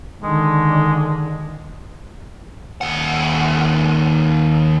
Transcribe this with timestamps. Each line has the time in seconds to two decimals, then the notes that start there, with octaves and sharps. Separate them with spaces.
0.22 D3 D#3 G#3
2.81 D#2 F#5